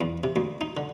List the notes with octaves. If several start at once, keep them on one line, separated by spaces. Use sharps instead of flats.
E2
C3
D2
D#4
D3